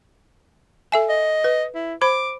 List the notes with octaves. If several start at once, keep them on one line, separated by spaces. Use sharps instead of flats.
A4 E5 G#5
D#5
B4
E4
C5 B5 D6